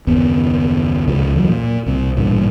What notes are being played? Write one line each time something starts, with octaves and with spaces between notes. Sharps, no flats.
F#1 D#2 B3
C#2 C#3 F3
E2 F3 F#3
A#2
C2 C3
A1 G2 A#2